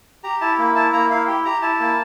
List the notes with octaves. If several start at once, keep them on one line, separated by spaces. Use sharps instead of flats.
G4 A#5
E4 A5
A#3
E4 A5
A#3 A#5
E4 F5
G4 G5
G4 A#5
E4 A5
A#3